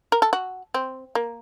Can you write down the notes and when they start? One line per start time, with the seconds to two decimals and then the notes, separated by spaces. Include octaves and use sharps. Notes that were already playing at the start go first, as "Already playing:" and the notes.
0.12 A#4
0.22 A4
0.33 F#4
0.74 C4
1.15 A#3